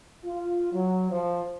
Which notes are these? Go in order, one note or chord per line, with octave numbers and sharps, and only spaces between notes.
F4
F#3
F3